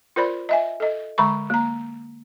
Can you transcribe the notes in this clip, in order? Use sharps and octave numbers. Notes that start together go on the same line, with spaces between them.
F4 A#4 C5 D5 B5
D#5 E5 G#5
A4 D#5
D3 G#3 A#5 B5 C#6
A#3 A#5